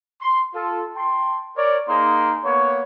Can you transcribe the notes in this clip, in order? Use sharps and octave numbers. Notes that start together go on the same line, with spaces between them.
C6
F4 A4
G5 A5 C6
A#4 C#5 D5
A#3 D#4 G#4 A#4 C6
A#3 B3 C#5